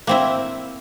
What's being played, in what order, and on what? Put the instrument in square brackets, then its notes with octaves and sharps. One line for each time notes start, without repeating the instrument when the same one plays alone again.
[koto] A#3 C4 E4